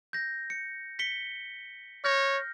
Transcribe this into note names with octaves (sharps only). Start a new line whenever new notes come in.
G6 A#6
C#7
B6 C#7 G7
C#5 F6 G6 A#6